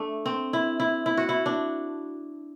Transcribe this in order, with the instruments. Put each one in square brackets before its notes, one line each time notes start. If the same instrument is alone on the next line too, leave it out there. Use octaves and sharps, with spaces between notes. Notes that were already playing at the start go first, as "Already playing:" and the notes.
Already playing: [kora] A3 D4
C4
E4
E4
E4
F#4
E4
D4